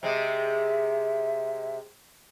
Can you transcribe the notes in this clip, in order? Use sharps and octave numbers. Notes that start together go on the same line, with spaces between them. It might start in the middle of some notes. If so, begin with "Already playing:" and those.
C3 G#3 E5